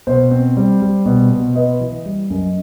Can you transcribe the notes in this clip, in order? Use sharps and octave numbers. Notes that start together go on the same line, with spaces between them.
B2 C5
C4
G3
G3
B2
B2
B3 D#5
E3
G3
F#2